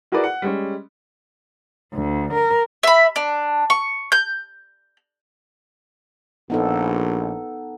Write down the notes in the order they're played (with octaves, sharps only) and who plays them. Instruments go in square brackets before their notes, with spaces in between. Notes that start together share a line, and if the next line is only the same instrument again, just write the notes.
[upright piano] E4 F#4 G#4 A#4 B4 D5
F#5
G3 G#3 C#4
[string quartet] D2
A#4
[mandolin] E5 B5
D4
C#6
G6
[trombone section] A#1 [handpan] B3 D#4 A4